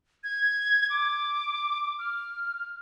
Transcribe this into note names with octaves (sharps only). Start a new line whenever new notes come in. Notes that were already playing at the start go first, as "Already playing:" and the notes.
G#6
D6
F6